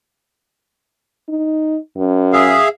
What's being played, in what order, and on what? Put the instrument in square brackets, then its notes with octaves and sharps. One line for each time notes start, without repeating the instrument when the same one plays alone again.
[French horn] D#4
F#2
[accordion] G#4 E5 F5